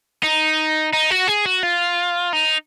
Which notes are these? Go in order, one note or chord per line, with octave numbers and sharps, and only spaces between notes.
D#4
D#4
F#4
G#4
F#4
F4
D#4